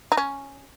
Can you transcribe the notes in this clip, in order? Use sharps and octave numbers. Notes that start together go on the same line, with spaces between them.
D#4
C#4